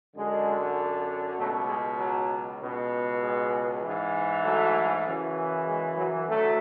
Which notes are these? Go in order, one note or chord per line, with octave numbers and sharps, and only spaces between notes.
F#2 D3 G#3
C#2 B2 F#3 A3
G#3
F#3
C#2 B2
G#3
G#2 E3
F#3 A3
F#2 C#3 E3
G#3
F#3
D2 F#3 A3